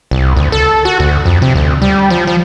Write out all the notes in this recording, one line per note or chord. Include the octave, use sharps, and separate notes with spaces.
C2
D2
A4
F#4
D2
F2
C3
D2
G3
F3
F3